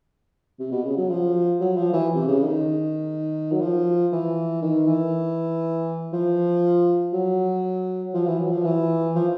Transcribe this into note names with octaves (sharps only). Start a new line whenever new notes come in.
C3
B2
C#3
F#3
F3
F#3
F3
E3
C3
C#3
D#3
F#3
F3
E3
D#3
E3
F3
F#3
F3
E3
F#3
F3
E3
F3